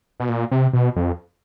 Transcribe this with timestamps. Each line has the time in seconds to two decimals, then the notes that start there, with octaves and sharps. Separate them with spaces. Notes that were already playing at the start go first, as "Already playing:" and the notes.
0.20 B2
0.29 A#2
0.51 C3
0.73 B2
0.96 F2